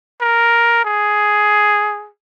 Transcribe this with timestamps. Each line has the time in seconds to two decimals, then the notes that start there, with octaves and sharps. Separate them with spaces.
0.21 A#4
0.85 G#4